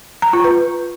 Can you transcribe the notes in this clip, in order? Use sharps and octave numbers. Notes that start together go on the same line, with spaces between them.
A#5
F4
B4